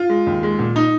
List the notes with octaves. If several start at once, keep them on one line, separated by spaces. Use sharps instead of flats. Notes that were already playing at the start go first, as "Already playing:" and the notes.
Already playing: F4
G#3
D#2
G#3
A#2
D#4